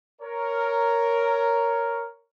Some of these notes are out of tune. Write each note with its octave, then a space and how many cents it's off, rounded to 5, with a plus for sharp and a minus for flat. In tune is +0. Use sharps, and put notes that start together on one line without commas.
A#4 +0 C#5 +10